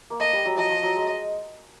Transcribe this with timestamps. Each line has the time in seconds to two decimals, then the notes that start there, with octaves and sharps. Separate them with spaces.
0.10 A#3
0.20 A3 D#5
0.33 G3
0.46 F#3
0.57 F3 D#5
0.70 F3
0.83 F#3
0.96 G#3